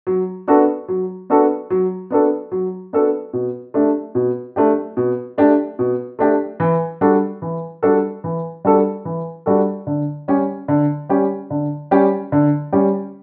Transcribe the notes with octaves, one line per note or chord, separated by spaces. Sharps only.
F#3
B3 D4 F#4 A4
F#3
B3 D4 F#4 A4
F#3
B3 D4 F#4 A4
F#3
B3 D4 F#4 A4
B2
A3 D4 G4
B2
A3 D4 G4
B2
A3 D4 G4
B2
A3 D4 G4
E3
G3 D4 F#4 A4
E3
G3 D4 F#4 A4
E3
G3 D4 F#4 A4
E3
G3 D4 F#4 A4
D3
G3 C#4 G4
D3
G3 C#4 G4
D3
G3 C#4 G4
D3
G3 C#4 G4